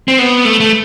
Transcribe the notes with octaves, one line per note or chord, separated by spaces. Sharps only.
C4
B3
A3
A3